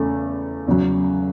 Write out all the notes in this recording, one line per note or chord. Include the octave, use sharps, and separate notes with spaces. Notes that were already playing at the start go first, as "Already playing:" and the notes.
Already playing: E2 C#3 A3
E2 C#3 F#3